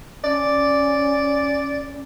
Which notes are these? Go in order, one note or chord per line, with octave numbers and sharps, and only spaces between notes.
C#4 D5